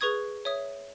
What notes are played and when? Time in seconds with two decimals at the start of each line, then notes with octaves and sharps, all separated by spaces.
0.01 G#4 B4 C#6 D#6 G#6
0.45 C#5 E5 D#6